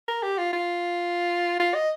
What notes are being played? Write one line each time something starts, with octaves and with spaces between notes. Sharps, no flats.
A#4
G4
F4
F4
F4
D#5